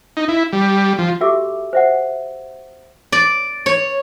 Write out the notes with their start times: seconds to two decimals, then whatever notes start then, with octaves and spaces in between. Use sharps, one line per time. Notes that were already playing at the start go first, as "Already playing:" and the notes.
0.17 D#4
0.28 E4
0.53 G3
0.99 F3
1.21 F#4 G4 A4 E5 D6 E6
1.73 C5 E5 F#5
3.12 D5
3.66 C#5